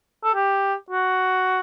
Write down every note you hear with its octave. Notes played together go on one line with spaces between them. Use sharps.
A4
G4
F#4